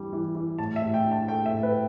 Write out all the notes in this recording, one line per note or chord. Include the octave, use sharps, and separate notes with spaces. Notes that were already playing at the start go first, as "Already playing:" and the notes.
Already playing: E3 G3 D4
E3
E3
A2 A5
E5
A2
G5
D4
A5
A3 G5
E5
A2
B4